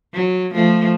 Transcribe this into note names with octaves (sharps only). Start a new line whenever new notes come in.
F#3
F3 A3